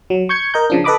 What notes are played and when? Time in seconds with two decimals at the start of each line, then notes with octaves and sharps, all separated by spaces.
0.10 F#3
0.29 C#6 G6 G#6 C#7
0.54 A#4 D#5 A#5 G6
0.70 C#3 F3 D4
0.84 A4 B4 D#5 B5 D6 D#6